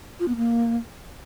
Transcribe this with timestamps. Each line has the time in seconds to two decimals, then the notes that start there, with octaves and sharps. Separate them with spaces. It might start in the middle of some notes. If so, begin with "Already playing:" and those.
0.20 F4
0.28 B3
0.36 A#3